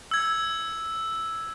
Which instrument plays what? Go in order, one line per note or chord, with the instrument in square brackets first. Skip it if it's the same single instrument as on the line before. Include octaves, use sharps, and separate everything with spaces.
[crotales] E6 G#6